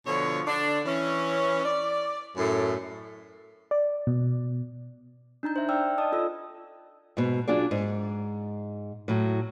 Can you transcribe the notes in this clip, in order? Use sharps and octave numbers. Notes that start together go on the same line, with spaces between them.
B2 D3 F3 C#5
D3 D4
E3 C#4
D5
F#2 A2
D5
B2
D4 D#4 A#5 G6
C5 E5
D5 G5 E6 F6
D5 D#5 A5 D#6
F4 A4 E6
G#2 B2
F#3 D4 F4 G#4 D5
G#2
A2 F#3